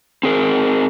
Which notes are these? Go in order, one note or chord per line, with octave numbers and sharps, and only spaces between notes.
C4 G#4 A#4